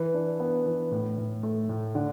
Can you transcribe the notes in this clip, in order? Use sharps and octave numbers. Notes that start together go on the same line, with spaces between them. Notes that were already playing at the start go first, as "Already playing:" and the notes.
Already playing: E3
D4
B3
E3
A2
A2
A3
A2
D3